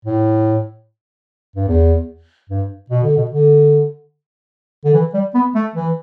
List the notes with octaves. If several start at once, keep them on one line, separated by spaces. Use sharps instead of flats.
A2
G2
E2
G2
B2
D3
B2
D3
D3
E3
G3
B3
A3
E3